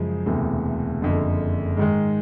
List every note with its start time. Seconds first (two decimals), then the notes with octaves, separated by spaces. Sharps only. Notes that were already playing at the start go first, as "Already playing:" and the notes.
Already playing: F#2 C#3 F3 G#3
0.26 E1 D2 C3 E3
1.02 F#1 F2 D3
1.77 G#2 D#3 G#3